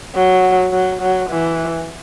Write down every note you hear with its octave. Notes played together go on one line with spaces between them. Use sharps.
F#3
F#3
F#3
E3